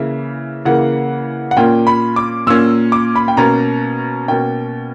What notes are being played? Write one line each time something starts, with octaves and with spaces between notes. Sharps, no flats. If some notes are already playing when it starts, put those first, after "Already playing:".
Already playing: C#3 E3 A#3 E5
C#3 E3 A#3 F#5
F#5
A#2 A#3 C#4 G5
B5
D6
A#2 A#3 C#4 E6
D6
B5
G5
B2 A#3 C#4 A#5
B2 A#3 C#4 G5